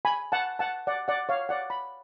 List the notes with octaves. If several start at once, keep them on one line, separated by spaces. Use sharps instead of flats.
G#5 B5
F#5 A5
F#5 A5
D5 F#5
D5 F#5
C#5 F5
D5 F#5
B5